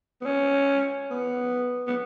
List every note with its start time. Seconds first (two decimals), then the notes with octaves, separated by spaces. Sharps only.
0.21 B3
0.26 C#4
1.11 B3
1.87 B3